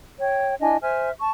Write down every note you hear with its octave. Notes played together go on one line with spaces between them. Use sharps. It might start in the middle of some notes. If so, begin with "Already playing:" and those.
C#5 G5
D4 E4 D#5 G#5
C5 E5 G#5 F6
A5 C#6